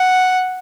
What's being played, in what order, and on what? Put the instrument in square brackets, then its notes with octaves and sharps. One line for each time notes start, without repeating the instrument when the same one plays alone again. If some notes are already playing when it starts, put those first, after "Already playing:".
Already playing: [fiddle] F#5